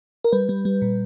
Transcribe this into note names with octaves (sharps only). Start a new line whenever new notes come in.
A#4
G3 B4
G3
G3
A#2